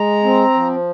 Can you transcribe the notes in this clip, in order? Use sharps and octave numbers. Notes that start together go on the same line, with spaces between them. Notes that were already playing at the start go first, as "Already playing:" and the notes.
Already playing: G#3 A#5
C4
F3